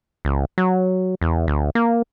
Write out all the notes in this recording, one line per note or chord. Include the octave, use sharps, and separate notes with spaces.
C#2
F#3
E2
D2
A#3